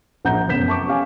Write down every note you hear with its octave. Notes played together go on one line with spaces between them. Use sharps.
A#1 F#5 A#5 G6
F1 F#2 B3 G6 B6 E7
A5 C#6 D6
C#4 G4 F5 G#5